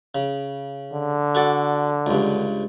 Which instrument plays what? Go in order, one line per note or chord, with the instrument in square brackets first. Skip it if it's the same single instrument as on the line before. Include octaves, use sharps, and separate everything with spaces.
[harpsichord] C#3
[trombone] D3
[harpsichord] F#4 A4 D5
C#2 G2